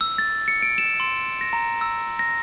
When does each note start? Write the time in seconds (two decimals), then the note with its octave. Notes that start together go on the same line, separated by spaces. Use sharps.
0.01 E6
0.18 A6
0.48 C#7
0.63 D7
0.78 E7
1.00 C6
1.41 A#6
1.53 A#5
1.81 E6
2.19 A#6